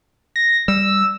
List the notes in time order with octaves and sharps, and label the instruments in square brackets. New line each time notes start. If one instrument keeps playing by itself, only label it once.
[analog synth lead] A#6
[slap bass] G3 [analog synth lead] E6